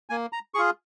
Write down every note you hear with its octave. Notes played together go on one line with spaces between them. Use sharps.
A#3 G#5
A#5
F4 G#4 C#6